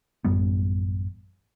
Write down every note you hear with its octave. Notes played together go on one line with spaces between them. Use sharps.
A1 F#2 G3 B3